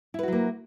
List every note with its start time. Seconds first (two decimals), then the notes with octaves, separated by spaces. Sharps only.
0.14 E4
0.19 B4
0.23 F#4
0.28 F#3
0.32 A#3